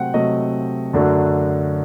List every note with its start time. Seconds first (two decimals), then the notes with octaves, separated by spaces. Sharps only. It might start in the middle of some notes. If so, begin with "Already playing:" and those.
Already playing: C3 F#3 A3 C4 F#5 G5
0.14 C3 F#3 A3 C4 D#5
0.93 F#2 D3 F#3 A3 D4